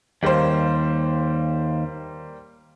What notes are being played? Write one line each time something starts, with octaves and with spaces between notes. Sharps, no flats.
D#2 G3 A#3 C5